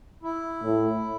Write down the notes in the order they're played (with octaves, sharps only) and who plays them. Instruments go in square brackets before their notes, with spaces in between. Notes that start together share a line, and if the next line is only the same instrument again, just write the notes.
[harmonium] E4
[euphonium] A2